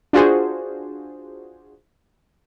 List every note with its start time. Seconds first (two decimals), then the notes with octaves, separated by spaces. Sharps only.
0.13 D4 F4 F#4 G#4 C5